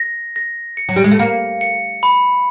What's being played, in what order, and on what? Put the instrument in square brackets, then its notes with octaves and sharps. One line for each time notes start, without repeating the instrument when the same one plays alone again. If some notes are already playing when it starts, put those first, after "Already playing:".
Already playing: [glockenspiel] A#6
A#6
C#7
[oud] F#3
G3
G#3
A3
[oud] A#3 [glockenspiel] C#7
[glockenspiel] C#7
B5